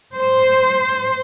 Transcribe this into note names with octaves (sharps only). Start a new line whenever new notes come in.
C5